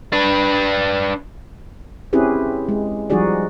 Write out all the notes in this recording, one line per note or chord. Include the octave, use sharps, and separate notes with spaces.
D4 B4
C4 C#4 E4 G4 G#4 B4
G#3
F3 G3 D#4 F#4 G#4 D5